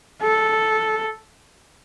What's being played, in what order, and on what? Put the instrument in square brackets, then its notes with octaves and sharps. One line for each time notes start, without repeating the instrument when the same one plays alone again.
[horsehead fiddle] A4